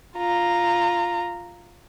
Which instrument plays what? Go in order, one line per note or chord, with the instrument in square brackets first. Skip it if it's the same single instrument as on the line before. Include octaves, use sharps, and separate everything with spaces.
[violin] F4 A#5